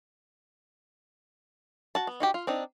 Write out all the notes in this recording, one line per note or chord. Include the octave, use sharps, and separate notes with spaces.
F#4 A5
B3
D#4 F#4 G4
F4
C4 D4 D#4